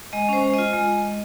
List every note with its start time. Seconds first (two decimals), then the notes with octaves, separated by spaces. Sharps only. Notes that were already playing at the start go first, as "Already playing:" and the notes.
0.13 G#3 D#5
0.29 C#4 C5
0.43 G#3
0.54 F4 D#5
0.73 G#3